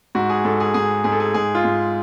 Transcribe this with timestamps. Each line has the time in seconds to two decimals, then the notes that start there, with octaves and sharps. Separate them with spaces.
0.15 G#2 F#4
0.30 G#4
0.45 G#2 A4
0.60 G#4
0.74 G#2 G#4
1.04 G#2 G#4
1.12 A4
1.20 G#4
1.34 G#2 G#4
1.55 F4
1.65 G#2